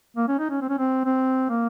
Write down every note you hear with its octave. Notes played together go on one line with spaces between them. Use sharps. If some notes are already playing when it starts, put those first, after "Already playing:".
A#3
C#4
D#4
C#4
C4
C#4
C4
C4
A#3